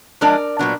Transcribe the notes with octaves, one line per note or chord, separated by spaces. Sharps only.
F3 G#3 D4 A#4 D5
A#2 F#3 B3 D4